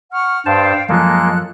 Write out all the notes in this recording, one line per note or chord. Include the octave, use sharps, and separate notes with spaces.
F#5 C#6 F6
G2 C5 F5 G5 A5
F#2 F3 G#3 A#3 A4 F#6